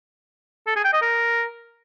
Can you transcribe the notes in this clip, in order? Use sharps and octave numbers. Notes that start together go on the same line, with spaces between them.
A4
G#4
G5
D#5
A#4